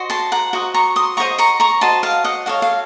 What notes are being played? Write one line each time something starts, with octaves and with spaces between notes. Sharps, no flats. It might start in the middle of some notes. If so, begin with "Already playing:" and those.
Already playing: F#4 C5 D#5
A5 C6
F#5 A#5
F#4 C5 D#5
A#5 C#6
C6 D#6
F#4 C5 D#5 A#5 C#6
A#5 C#6
A#5 C#6
F#4 C5 D#5 A5 C6
F5 A5
D#5 F#5
F#4 A4 C#5 F5
F5